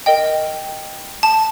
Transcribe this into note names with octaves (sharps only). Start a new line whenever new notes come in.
A#4 D#5 G5
A5